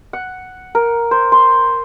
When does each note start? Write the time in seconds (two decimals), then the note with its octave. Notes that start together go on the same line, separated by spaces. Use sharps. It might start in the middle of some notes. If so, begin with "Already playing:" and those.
0.13 F#5
0.75 A#4
1.11 C5
1.32 C6